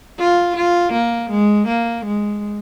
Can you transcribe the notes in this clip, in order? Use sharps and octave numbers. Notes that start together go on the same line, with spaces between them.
F4
F4
A#3
G#3
A#3
G#3